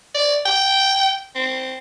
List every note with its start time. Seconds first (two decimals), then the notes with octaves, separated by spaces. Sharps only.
0.15 D5
0.46 G5
1.35 C4